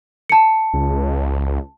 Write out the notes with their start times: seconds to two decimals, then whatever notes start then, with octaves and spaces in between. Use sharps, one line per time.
0.29 A5 C#7
0.74 C#2